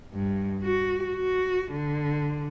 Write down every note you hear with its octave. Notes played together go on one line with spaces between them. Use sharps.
G2
F#4
F#4
D3